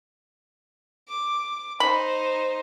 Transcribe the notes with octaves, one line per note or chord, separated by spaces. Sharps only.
D6
D#4 C5 B5